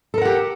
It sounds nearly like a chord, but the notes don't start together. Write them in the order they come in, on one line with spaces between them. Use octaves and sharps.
A4 A#4 F#5 G4